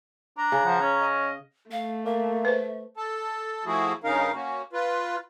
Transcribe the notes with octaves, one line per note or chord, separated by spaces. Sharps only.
D4 A#5
C#3
F3 F#5
C#4 C#5
D#5
A3 F5
A#3 E5
B4 C5
A4 A5
F3 A3 E4 F#4 G#4
G2 C#3 C#4 D#4 A#4 F5
A#3 C#4 F#4
F4 B4